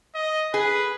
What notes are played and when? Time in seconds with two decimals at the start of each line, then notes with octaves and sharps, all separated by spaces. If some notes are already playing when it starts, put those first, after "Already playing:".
0.15 D#5
0.54 G#4 B4